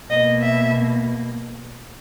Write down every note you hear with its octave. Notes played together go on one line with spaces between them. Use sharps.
B2 A#3 D#5
E5